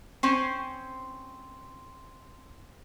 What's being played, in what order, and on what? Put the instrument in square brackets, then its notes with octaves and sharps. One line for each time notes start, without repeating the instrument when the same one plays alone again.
[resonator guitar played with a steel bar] C4 C#4 C5